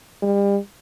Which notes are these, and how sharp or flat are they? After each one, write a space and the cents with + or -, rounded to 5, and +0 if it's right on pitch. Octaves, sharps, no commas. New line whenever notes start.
G3 +35